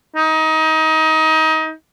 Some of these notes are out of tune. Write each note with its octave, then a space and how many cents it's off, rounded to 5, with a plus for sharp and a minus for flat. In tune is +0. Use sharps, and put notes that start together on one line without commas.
D#4 +25